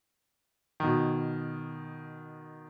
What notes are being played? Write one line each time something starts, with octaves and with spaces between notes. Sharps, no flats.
B2 D#3